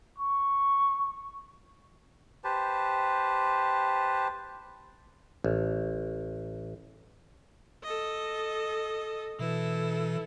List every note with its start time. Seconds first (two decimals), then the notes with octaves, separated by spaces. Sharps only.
0.18 C#6
2.44 G4 B4 C5 A5
5.44 A1
7.83 A4 D#5
9.39 B2 E3 E4 A4 B4